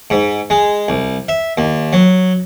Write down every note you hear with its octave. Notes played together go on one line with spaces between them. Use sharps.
G#2
G#3
C2
E5
D#2
F#3